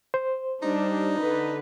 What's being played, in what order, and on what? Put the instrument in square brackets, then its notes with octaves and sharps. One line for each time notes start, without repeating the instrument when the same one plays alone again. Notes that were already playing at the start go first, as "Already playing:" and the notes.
[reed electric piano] C5
[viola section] G3 D4 [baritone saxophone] D#4
[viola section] D3 B4